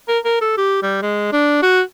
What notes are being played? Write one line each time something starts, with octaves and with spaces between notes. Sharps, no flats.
A#4
A#4
A4
G4
G3
G#3
D4
F#4